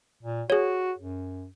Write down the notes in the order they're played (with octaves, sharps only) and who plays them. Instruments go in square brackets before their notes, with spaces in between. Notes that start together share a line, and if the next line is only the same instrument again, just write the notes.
[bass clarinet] A#2
[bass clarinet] F#4 [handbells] G#4 C#5
[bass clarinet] F#2